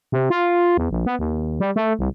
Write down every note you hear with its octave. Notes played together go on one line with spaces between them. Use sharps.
C3
F4
E2
A#1
B3
D#2
G3
A3
C2